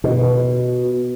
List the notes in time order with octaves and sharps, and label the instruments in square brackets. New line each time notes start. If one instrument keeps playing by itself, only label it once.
[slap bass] B2